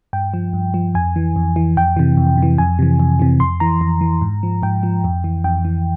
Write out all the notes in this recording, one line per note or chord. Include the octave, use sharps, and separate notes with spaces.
G2 G5
F3
G2
F3
F2 G#5
E3
F2
E3
F2 G5
C3 E3
F2
C3
E3
F2 G#5
C3 E3
F2
C3 E3
F2 C6
E3 A#5
F2
E3
G#2
F3
G#2 G5
F3
F2
E3
F2 G5
E3